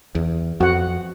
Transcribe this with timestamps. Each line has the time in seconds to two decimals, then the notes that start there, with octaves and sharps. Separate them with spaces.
0.15 E2
0.61 F2 F#4 F#5